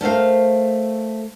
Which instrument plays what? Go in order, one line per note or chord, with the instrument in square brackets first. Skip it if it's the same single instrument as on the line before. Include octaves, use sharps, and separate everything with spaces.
[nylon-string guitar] A3 A#4 C5 F5